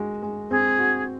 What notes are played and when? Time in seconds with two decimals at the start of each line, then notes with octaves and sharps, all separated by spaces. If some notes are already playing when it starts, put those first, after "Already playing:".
Already playing: G#3 F#4
0.22 G#3
0.51 C4 G#4
0.79 F#4